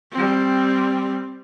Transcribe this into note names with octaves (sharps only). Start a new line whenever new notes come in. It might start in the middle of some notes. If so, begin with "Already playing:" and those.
G3 C4